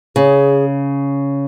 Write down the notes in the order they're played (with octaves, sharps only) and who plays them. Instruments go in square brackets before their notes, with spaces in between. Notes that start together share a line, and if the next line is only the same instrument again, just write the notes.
[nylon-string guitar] C#3 [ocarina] G#4